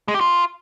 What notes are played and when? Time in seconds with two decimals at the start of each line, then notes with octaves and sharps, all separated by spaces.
0.08 G#3
0.14 G4
0.21 F4